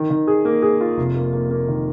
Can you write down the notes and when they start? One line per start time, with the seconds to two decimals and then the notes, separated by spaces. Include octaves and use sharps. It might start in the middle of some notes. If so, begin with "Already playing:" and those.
Already playing: D#3
0.10 D#3
0.27 G#4
0.45 A#3
0.62 G#4
0.81 F4
0.98 F1
1.15 A#3
1.33 A#3
1.50 A#3
1.68 D#3